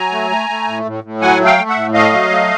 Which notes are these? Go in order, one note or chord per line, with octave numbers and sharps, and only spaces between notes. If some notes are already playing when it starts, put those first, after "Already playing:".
Already playing: F#3 G#5 A#5
A3
A3
A3
A2
A2
A2
F#3 F#5 G#5
A3
F5 G5
A3
E5 F#5
A2
A3 D#5 F5
F#3
A3